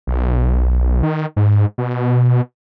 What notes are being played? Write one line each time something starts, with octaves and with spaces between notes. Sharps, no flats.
B1
D#3
G#2
B2